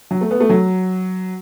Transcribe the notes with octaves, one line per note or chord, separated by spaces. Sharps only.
F#3
A3
B3
A3
F#3